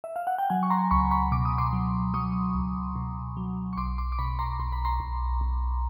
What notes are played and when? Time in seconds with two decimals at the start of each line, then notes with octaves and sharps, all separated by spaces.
0.04 E5
0.16 F5
0.27 F#5
0.38 G5
0.50 F#3 F#5 G#5
0.63 C#6
0.70 A#5 C6
0.91 C#2 B5 C#6
1.11 B5 C#6
1.32 B2 D6
1.45 D#6
1.58 C6 D6
1.73 F#3
2.14 F#3 C#6 D#6
2.54 C#2
2.96 B2
3.37 F#3
3.73 C#6
3.77 B1 C6 D6
3.98 C6 D6
4.12 D6
4.19 B2 B5 C#6
4.39 A#5 C6
4.60 B1 C6
4.72 B5
4.85 A#5 C6
5.00 B1
5.41 B1